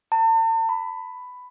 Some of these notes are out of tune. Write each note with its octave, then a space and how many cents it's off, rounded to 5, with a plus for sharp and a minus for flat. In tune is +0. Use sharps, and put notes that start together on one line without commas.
A5 +45
B5 +10